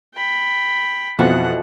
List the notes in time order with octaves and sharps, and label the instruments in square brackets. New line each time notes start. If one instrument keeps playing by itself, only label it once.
[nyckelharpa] G5 B5
[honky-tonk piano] F2 B2 [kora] E3 F3 F#4 [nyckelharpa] F#5